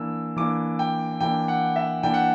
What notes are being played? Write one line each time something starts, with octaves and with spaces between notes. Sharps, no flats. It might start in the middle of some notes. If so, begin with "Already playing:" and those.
Already playing: E3 A#3 D4 E6
E3 A#3 D4 D6
G5
E3 A#3 D4 G5
F#5
E5
E3 A#3 D4 G5
F#5